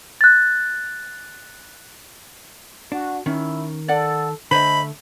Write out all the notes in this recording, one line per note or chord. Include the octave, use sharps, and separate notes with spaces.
F#6 A6
D4 F#4
D#3 C#4 E4
A4 D5 F#5
D3 A3 C5 D#5 B5